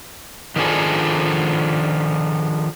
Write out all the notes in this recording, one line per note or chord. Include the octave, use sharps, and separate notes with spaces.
D#3 F3 D4 G#4 A4